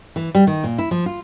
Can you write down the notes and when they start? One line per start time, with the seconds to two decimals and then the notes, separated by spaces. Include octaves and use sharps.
0.16 E3
0.35 G3
0.47 D#3
0.64 A#2
0.78 E4
0.91 F3
1.06 F4